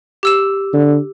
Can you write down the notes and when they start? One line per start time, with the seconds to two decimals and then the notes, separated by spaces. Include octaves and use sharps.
0.23 G4 E6 E7
0.73 D3